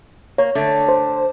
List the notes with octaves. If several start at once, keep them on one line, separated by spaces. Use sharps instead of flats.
A#3 C#5
D3 A3 D4
C5